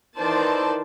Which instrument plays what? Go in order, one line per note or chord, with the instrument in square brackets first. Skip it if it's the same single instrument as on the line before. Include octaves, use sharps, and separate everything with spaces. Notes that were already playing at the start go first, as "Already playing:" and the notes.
[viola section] D#3 E3 C5 D5 A5